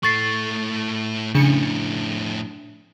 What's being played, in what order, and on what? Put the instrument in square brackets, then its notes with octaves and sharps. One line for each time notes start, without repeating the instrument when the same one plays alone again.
[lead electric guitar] A2 A3 [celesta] C#6 A6 C7
[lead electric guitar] F2 A2 [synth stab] C#3 C#7 [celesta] D4